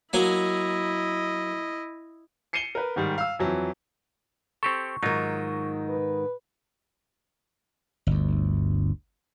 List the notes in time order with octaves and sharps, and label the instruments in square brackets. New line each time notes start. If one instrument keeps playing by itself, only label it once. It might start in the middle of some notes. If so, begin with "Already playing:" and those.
[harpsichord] F#3 A#3 G#5 [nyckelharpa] E4 D#5
[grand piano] C7 C#7 D#7 E7 G7
A#4 B4
G#2 D#3 G3
F5 E6
F2 E3 F#3
[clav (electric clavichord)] C4 G4 A4 [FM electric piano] C#6
[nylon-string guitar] G#2 D#3 [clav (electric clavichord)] F#3 D#4 F4
[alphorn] B4
[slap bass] G1 D2